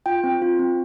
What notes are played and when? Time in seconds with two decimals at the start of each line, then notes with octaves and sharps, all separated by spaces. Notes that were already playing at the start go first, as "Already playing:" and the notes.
0.06 F4 G5
0.24 C4
0.42 F4
0.59 C4